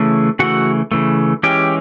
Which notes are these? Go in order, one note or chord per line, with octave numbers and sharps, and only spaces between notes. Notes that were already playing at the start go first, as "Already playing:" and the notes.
Already playing: C#3 E3 A3
C#3 E3 A3 F#4 F#5
C#3 E3 A3
E3 G#3 C#4 G4 G5